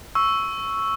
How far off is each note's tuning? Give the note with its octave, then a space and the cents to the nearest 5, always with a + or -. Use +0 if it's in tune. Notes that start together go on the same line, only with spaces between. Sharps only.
C#6 +0 E6 +0